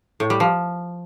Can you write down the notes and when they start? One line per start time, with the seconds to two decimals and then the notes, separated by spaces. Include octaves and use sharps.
0.20 A2
0.30 G3
0.40 F3